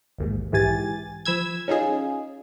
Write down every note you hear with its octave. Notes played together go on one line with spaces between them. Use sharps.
A1 D#2 G#2
B1 G#2 E3 G4 G#5 A6
F3 B5 E6 G#6
C#4 D#4 F4 G#4